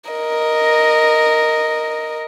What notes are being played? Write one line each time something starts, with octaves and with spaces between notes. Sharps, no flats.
A#4 D#5